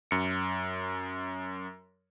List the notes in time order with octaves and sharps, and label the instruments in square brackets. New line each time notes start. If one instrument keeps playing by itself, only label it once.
[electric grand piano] F#2 C#7